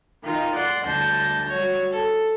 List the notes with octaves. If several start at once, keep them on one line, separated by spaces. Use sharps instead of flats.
D#3 D#4 F4
D5 F#5 C6
D2 G3 D4 A5 G6 A#6
G3 F#4 C#5
A4